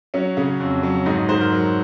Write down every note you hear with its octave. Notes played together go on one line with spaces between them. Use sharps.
F#3 C#4
C#3
F2
F#3
G#2 D#4
D#4
G#2 C5
A#4
F#3